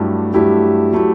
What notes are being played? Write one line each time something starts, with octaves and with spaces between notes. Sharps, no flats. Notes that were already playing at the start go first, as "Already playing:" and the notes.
Already playing: G2 F#3 A3 E4 G4
G2 F#3 A3 E4 G4
F#3 A3 E4 G4